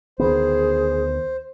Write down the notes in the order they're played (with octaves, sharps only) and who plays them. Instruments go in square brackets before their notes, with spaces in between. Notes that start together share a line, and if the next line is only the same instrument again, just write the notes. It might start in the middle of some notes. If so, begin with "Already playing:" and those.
[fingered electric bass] D2 D#3 B3 [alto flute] G#4 [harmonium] C5